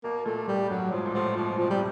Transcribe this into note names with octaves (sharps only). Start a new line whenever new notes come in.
B2 A#3
A#2 A3
A2 G3
G2 F#3
G#2 F3
A#2
A2 F3
B2 F3
C3 F3
C3 G3